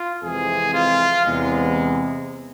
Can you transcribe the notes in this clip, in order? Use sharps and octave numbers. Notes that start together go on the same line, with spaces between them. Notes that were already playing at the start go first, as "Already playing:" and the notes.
Already playing: F4
F2 C3 E3 G#3 G#4
F4
E2 C3 G#3